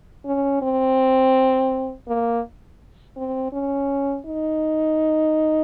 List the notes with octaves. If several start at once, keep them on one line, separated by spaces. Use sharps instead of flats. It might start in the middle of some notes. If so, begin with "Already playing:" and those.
C#4
C4
A#3
C4
C#4
D#4